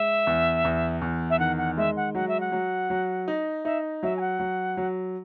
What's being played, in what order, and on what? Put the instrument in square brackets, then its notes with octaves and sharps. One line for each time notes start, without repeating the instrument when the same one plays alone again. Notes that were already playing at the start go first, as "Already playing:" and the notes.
Already playing: [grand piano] G#3 [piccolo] E5
[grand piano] E2
E2
E2
[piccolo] E5
[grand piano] D#3 [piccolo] F#5
[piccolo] F#5
[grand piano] G#3 [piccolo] E5
[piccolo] F#5
[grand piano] F#3 [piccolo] F#5
[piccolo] E5
F#5
[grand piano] F#3
F#3
D#4
[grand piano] D#4 [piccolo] E5
[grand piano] F#3 [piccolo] E5
[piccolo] G#5
F#5
[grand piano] F#3
F#3